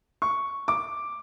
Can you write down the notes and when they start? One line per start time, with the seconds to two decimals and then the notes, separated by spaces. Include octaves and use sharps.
0.22 C#6
0.68 D6